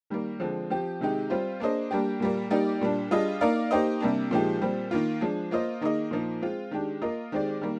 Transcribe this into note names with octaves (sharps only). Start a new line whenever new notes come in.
D#3 G3 A#3
D3 F3 G#3 C4
F3 C4 G4
C3 D#3 G#3 D#4 G4
G3 C4 F4 C5
A#3 D4 G#4 C5 D#5
G3 A#3 D4 G4
A#2 G3 A#3
G3 A#3 D#4 G4 D5
A#2 G3 D4
G3 D4 F4 G#4 D#5
A#3 D#4 A#4 D5 F5
A#3 D#4 G4 C5 D#5
C3 G3 A#3 D4
A#2 F3 G#3 D#4 G4
A#2 G3 C4
D#3 A#3 F4
F3 G#3 D4 G#4
A#3 F4 C5 D#5
D#3 A#3 D#4 G#4 D#5
A#2 F3 A#3 D#4
G#3 C4 F4
D#3 G#3 D4 G4
A#3 F4 A#4 D#5
D#3 G#3 C4 G4 D5
D#3 G3 A#3